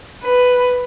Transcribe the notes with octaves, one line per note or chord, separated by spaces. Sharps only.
B4